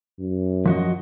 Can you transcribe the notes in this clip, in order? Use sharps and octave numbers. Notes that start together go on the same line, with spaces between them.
F#2
F3 F#4 D#5